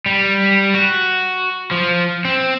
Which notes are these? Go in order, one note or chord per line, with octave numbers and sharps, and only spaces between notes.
G3
F#4
F3
C4